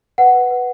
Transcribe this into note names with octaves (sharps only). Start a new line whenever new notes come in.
B4 F#5
B4
B4